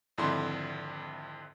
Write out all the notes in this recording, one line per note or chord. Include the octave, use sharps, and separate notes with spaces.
G#1 F2 D3 E4 C6